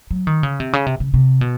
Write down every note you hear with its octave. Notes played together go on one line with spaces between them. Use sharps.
F#3
D#3
C#3
C3
C#3
C3
C#3
C3
B2